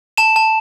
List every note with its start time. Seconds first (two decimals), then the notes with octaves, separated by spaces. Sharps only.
0.18 A5 E7
0.36 A5